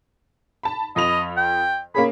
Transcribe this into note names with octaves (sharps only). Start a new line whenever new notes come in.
A5 B5
F2 D#5 B5 F7
G5
A#3 C#4 G#4 B5